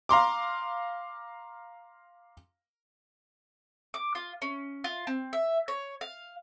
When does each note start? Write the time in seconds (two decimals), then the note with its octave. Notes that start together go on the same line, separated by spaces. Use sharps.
0.09 F5 A#5 C6 D6
3.94 D6
4.15 F4
4.42 C#4
4.84 F4
5.07 C4
5.33 E5
5.68 C#5
6.01 F5